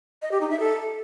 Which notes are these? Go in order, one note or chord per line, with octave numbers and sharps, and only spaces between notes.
D#5
G4
D#4
E5
A4